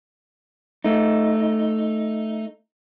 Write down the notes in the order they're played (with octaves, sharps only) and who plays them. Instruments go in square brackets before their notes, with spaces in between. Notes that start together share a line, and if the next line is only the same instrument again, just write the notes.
[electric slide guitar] A3 D#4